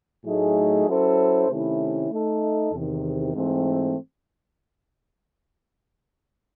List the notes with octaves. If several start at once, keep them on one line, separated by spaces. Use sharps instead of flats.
A2 F#3 A3 D#4 G#4
F#3 C#4 E4 A4 C5
C3 D#3 A3 C#4 E4
A3 D#4 A4
E2 C3 D#3
G#2 E3 A3 C4